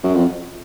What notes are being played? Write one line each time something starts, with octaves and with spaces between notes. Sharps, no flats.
F#2
F2